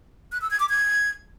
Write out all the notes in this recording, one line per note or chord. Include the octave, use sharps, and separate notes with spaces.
F#6
E6
G#6
D6
G#6